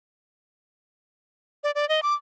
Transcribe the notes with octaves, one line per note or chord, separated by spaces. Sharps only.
D5
D5
D#5
D6